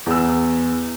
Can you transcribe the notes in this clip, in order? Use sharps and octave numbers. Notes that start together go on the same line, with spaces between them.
E2 E6